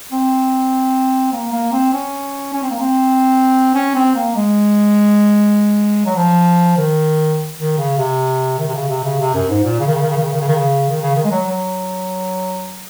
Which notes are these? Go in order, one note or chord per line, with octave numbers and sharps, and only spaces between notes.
C4
A#3
A#3
C4
C#4
C#4
C4
A#3
C4
C#4
C4
A#3
G#3
F#3
F3
D#3
D#3
C#3
C3
D#3
C3
C#3
C3
C#3
C3
F#2
G#2
A#2
C#3
D#3
C#3
D#3
C#3
D#3
C#3
D#3
C#3
D#3
C#3
D#3
C#3
D#3
G#3
F#3
F#3